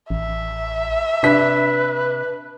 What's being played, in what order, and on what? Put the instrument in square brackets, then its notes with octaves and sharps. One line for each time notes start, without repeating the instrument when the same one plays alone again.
[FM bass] A1 [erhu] E5
[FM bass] C3 [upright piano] D4 B6 [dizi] B4